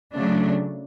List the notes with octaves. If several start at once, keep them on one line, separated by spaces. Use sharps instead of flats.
C#3 F#3 A3 D4